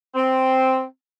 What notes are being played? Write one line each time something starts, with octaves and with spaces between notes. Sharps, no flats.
C4